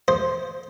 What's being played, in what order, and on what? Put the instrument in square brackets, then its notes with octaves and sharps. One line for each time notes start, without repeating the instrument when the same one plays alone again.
[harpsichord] C5